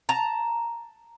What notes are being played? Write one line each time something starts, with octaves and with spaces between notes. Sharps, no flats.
A5 A#5